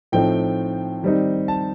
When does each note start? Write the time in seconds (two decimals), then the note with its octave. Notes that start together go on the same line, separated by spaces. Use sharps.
0.12 A2 F3 A3 C4 D#4 G5
1.03 D#3 G3 C4 D#4
1.48 A5